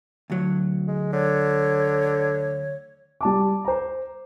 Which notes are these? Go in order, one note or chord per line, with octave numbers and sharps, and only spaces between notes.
D2 F#3
G#3
D3 C#5
G3 A5 D6
C5 A#5